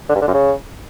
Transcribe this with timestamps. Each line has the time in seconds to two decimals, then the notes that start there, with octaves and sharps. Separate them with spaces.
0.09 D3
0.15 G2
0.21 D3
0.28 F#2
0.34 C#3